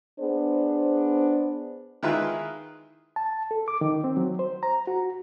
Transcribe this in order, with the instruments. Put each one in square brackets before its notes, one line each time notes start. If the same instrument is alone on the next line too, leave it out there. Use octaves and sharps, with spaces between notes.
[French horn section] B3 D4 G#4 C5
[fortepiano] D#3 G#3 E4 F4 G#4 B4
[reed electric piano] A5
A4
D6
D#3
C4
F#3
C5
A#5
F#4